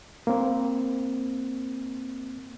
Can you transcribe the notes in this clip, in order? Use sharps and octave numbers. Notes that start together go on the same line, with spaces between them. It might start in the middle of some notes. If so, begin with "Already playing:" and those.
A#3 C4